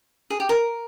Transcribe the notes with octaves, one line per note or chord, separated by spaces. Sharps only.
G#4
G4
A#4